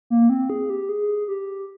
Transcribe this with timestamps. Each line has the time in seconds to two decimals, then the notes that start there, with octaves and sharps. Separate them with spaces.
0.10 A#3
0.29 C4
0.50 G#4
0.70 G4
0.89 G#4
1.28 G4